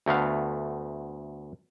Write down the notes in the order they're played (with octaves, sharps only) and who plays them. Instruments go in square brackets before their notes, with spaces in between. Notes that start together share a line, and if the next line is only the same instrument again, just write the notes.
[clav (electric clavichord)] D2 A3 B3 F5